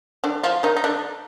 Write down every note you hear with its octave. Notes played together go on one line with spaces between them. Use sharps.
D3 D4
F3 F4
D#3 D#4
D#4
D3 D4